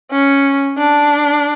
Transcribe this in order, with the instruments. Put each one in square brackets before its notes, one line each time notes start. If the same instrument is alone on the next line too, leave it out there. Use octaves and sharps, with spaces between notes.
[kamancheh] C#4
D4